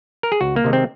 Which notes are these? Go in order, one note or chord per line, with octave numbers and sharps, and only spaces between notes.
A#4
G#4
C#2 F#4
A#3
C3 D#3 G#3
C4